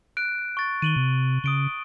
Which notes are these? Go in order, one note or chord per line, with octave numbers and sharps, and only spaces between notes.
F#6 D7
C#6 A6
D#3 D#7 F#7 G7
C3
C#3 D#6 D7 G7